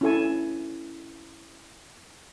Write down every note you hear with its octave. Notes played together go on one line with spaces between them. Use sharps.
C#4 E4 A4 G#5